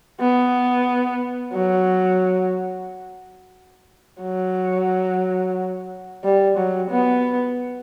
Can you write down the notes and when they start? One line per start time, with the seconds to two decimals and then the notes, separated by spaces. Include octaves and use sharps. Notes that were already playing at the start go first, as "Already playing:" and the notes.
0.19 B3
1.53 F#3
4.22 F#3
6.24 G3
6.56 F#3
6.90 B3